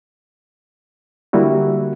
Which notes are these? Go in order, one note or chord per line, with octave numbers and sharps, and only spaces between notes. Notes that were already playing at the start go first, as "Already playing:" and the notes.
D3 G3 A#3 E4 F#4